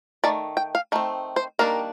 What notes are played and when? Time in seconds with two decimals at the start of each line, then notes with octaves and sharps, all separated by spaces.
0.24 D#3 A3 D5
0.57 G5
0.75 F5
0.92 D#3 A3 C4
1.36 C5
1.59 D#3 G3 A#3 D4 A#4